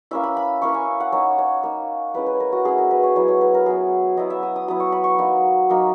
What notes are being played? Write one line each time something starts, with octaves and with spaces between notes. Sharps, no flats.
A#3 C#4 E4 E5
B5
B5
A#3 C#4 E4 C#6
G#5
F#5
A#3 D#4 C#5
C#5
A#3 D#4
G#3 C#4 E4 B4
B4
A#4
F#4
G#3 C#4 E4 G#4
A#4
B4
C#5
F#3 B3 E4 C#5
C#5
B4
A#4
F#3 B3 E4 G#4
F#3 B3 E4 D#5
E5
D#6
D#6
F#3 B3 E4 D#6
C#6
B5
C#6
F#3 A#3 D#4
F#3 A#3 D#4